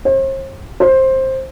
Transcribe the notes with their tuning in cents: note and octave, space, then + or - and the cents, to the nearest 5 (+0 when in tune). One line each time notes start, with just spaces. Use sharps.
C5 +45
C5 +15